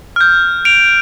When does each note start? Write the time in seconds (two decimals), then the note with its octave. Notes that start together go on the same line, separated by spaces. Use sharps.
0.16 F6 G6
0.65 D7 F7